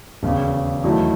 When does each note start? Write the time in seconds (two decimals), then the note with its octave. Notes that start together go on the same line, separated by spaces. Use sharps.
0.23 E1 D#2 C#3
0.84 E2 D#3 F#3 A3 E4